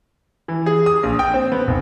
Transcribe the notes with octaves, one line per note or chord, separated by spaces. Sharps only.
E3
G#4
D#6
A#1
G5
C4
B3
F1